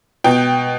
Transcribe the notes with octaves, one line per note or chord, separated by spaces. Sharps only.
B2 G5